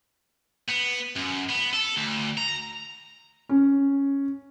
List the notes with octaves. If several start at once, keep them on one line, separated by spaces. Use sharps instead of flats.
B3
F#2
B3
A4
D2
A#5
C#4